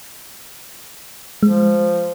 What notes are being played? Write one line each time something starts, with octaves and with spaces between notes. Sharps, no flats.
F3 G#3